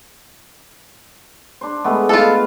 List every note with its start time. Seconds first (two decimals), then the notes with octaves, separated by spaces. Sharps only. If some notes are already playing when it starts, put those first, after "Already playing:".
1.61 D4 C5
1.84 G#3 A3 B3
2.09 F4 A4 B4 D#5 F5